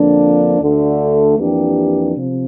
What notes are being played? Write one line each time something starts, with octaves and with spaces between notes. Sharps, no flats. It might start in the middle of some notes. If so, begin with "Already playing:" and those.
Already playing: F2 D3 F3 A#3 D4
D2 D3 A3
F2 E3 A#3 D4 G4
C3 F3